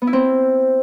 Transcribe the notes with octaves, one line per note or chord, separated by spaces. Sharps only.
B3
E4
C4